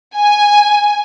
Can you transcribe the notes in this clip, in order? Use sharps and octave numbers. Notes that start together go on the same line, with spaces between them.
G#5